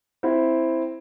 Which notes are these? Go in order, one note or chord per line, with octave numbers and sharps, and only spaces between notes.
C4 E4